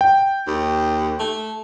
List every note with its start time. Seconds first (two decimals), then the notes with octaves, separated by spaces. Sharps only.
0.01 G5
0.48 D#2
1.20 A3